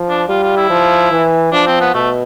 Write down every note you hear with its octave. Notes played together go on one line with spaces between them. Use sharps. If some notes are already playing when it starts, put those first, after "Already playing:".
Already playing: F3
D4
G3 F4
F4
E4
F3
E3
F3 D4
C4
B3
B2 A3